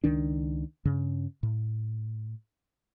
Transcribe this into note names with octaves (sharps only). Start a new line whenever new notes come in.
C#2 D#3 D4
G2 C#3
A2